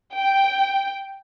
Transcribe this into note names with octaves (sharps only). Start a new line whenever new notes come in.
G5